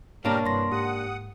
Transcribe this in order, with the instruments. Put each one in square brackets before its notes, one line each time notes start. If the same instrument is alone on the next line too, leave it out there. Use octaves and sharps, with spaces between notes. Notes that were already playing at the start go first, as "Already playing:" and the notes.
[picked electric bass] G#2 B2 [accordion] G3 A#4 [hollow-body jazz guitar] A#3 D4 [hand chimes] C#5 C#6
[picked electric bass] G2 C3 [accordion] E3 [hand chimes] C6 A#6
[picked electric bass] G#2 [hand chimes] G4 [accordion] F#5 D#6